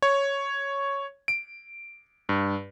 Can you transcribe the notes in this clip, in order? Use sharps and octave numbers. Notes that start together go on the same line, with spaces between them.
C#5
D7
G2